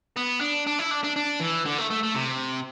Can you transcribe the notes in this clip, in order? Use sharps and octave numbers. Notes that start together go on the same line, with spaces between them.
B3
D4
D4
E4
D4
D4
D4
E3
D3
A3
A3
A3
C3